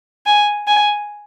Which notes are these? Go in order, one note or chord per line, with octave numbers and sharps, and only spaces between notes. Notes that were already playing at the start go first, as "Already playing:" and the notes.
G#5
G#5